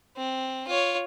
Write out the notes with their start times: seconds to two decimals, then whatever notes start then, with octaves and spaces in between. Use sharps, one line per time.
0.16 C4
0.67 F4 C#5